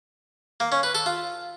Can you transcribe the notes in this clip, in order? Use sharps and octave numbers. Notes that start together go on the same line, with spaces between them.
A#3
C#4
B4
A4
F4